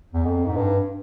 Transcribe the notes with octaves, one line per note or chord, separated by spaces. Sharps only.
E2
F2
G#2
G2